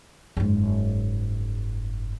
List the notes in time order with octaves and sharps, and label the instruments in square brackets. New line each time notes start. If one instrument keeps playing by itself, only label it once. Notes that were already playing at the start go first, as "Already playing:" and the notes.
[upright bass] F#1 G#2